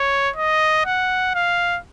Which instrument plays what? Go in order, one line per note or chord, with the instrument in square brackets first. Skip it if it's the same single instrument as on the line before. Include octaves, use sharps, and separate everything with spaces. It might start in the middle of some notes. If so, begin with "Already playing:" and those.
Already playing: [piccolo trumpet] C#5
D#5
F#5
F5